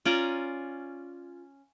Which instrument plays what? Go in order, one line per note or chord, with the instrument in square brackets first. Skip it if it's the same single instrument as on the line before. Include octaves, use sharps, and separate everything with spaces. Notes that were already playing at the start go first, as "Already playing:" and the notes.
[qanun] C#4 F4 D5 A#5